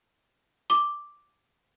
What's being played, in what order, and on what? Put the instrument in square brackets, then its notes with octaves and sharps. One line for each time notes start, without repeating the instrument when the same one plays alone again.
[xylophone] D6